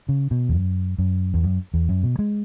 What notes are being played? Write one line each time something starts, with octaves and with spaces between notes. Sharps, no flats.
C#3
B2
E2
F#2
F#2
E2
F#2
E2
F#2
B2
G#3